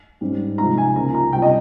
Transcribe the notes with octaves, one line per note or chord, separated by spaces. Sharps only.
G#2 G3 C#4
C3 F3 G#3 D#4 A#5
G#5
C#2 C#3 F3 A#3 A#5
A#5
C#2 C3 G3 C4 G5
D#5